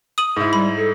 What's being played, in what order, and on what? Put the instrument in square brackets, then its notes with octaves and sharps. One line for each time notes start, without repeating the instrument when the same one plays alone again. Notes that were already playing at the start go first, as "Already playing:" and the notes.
[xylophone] D#6 D#7 F#7
[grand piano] G#2 E4
[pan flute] G3 [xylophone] B5
[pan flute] A4